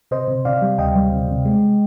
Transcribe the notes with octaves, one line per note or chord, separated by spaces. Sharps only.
C3 C5 D#5
C3
C3 D5 F5
G3
D2 D#5 G5
G3
C3
C3
G#3